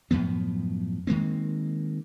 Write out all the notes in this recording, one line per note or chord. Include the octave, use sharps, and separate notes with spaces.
F#2 A2 F3 B3
D#3 G#3 A#3 C4